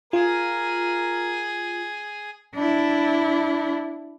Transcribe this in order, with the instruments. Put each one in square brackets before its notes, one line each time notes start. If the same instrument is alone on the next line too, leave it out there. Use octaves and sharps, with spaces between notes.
[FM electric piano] F4 [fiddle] G#4 [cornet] A#4
[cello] D4 E4